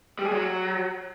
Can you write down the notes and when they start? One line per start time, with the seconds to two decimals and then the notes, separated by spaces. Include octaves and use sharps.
0.19 G3
0.25 G#4
0.31 F#3